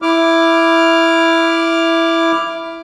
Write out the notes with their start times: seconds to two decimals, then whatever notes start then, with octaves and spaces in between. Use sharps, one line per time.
0.02 E4 D6 F6